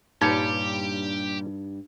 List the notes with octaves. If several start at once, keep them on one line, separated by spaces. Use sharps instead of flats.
G2 A#2 G3 D#4 G4 B4 C#5